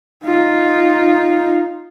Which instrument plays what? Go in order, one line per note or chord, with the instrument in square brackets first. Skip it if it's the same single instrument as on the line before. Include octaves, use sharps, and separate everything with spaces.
[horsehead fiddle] D#4 F4